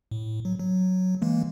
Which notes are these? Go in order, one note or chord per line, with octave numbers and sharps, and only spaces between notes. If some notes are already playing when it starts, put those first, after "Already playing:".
A2
F#3
F#3
E3 G#3 A#3